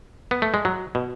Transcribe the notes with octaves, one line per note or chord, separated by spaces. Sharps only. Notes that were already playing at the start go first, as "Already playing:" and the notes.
B3
A3
G#3
F#3
B2